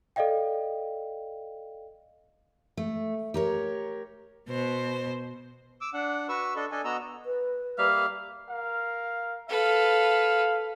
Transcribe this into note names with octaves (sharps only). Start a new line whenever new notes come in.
A4 D5 D#5 F5 G5
A3
G4 A#4 C#5
B2 C5
D6 E6
D4 F#5
F#4 B4 C#6 E6
D4 A4 D#5
D4 A4 D#5 G#5
B3 F#4 D#5 A#5 E6
B4
G3 A#3 E5 F5
A#4 F5
A4 B4 F5